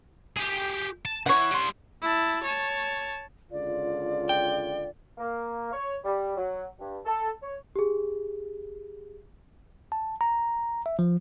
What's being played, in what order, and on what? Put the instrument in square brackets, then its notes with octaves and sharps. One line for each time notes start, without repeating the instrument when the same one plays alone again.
[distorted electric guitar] G4 G#4
A5
[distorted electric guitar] D2 E3 [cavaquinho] C#5 F#5
[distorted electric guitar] G3 C6
[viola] E4 A5
C#5 A5
[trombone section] C#2 D3 F4 [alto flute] D5
[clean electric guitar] G5
[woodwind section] A#3
C#5
G3
F#3
G2
A4
C#5
[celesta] G4 G#4
[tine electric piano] A5
A#5
E5
F3